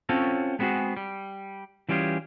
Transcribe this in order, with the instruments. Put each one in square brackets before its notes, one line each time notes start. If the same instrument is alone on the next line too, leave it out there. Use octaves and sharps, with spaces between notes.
[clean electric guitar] C4 C#4 F4 F#4 A4 C#5
G#3 B3 C4 D4 F#4 G#4
G3
E3 G3 C#4 F4 G4 G#4